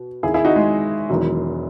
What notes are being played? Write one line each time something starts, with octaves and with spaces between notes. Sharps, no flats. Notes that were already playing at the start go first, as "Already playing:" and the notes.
Already playing: B2
D#2 D#3 E4 G#4
E4 G#4
D#4 F#4
G#3
E1 E2 D#3 F#3